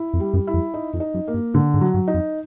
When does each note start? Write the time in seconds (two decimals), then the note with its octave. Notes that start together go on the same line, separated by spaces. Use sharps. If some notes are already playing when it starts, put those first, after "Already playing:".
Already playing: E4
0.14 F2
0.20 G3
0.34 F#2
0.47 E4
0.54 F2
0.74 D#4
0.94 F2
1.00 D#4
1.14 F#2
1.28 A#3
1.34 G2
1.54 G#2 D3
1.74 G#2
1.81 F#3
1.94 G2
2.08 D#4
2.14 F2